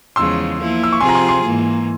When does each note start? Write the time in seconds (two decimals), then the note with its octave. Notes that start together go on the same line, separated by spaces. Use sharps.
0.16 E2 C#3 F3 G#3 C6 E6
0.58 F3 A#3 E4
0.83 E6
0.93 C#6
1.01 C3 F3 C4 F4 G#4 G#5 C6
1.09 A#5
1.15 G#5 C6
1.29 G#5 C6
1.43 G#2 E3 A#3